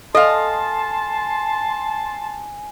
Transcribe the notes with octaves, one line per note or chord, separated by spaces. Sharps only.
A4 D#5 F5 G#5 A5 C6